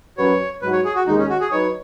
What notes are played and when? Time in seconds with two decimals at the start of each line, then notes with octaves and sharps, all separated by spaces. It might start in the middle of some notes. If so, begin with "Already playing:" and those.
0.17 F#2 F#3 C#4 F#4 B4 C#5
0.62 G#2 F#3 D#4 F#4 B4
0.73 C#5
0.85 G#4
0.95 F#4
1.07 D#2 D#3 G#3 D#4
1.18 C#4
1.29 F#4
1.40 G#4
1.52 F#3 D#4 B4 C#5